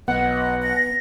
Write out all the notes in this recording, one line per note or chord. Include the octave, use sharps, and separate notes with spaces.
B1 B3 D#5 F#5
A#6